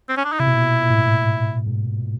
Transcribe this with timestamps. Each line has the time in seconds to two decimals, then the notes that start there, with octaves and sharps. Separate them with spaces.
0.09 C4
0.17 C#4
0.24 D4
0.32 D#4
0.39 C3 E4
0.47 B2
0.54 A#2
0.62 B2
0.82 A#2
0.90 A2
0.98 G#2
1.06 A2
1.24 G#2
1.66 G#2